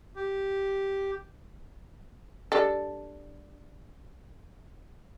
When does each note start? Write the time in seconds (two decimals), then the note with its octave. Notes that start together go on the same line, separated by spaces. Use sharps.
0.16 G4
2.52 G3 D4 A4